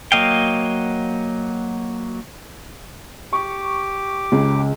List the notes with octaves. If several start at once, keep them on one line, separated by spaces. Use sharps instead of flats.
F#3 A#3 D#5 F5 G5
G4 C#6 D6
C#2 C#3